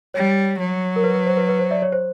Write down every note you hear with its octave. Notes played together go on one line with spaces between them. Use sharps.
G3 C#5
F#3
A#4
B4
B4
C5
B4
B4
C5
D5 E5
C#5
C5